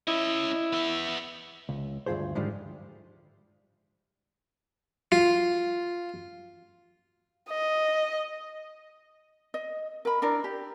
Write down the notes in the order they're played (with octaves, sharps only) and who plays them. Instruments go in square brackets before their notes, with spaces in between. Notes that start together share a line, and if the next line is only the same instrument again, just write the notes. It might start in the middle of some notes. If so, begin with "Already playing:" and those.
[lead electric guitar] C#4 D#5 [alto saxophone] E4
[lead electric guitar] B3 E5
[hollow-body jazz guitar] C#2
D2 G2 C#3 F4 G#4 C5
G#2 D3 D#3 F3 G3 G#3
[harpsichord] F4
[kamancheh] D#5
[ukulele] D#5
A#4 B5
D4 E4 A#4 D5
G4